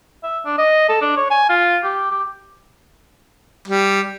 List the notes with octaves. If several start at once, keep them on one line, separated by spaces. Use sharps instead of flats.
E5
D4
D#5
A4
D4
C#5
G#5
F4
G4
G4
G3